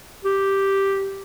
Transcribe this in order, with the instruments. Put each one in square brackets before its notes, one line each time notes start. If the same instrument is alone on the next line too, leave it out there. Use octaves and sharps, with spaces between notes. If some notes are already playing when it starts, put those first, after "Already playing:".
[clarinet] G4